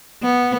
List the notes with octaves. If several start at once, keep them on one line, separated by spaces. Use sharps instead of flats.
B3